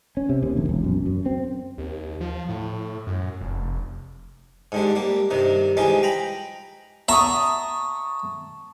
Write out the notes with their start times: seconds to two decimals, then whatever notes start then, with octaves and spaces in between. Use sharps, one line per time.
0.17 C#4
0.29 C3
0.43 D#2
0.57 A#1
0.69 E1
0.84 F#2
1.06 F#2
1.26 C4
1.78 D#2
2.21 F3
2.49 A2
3.07 F#2
3.41 F1
4.72 G#2 D3 G3
4.95 G3 A#3
5.31 G2 C3 D#3
5.77 E3 F3 G3 G#3 D#4 F4
6.03 G5 A#5 B5
7.09 E5 A5 A#5 C#6 D#6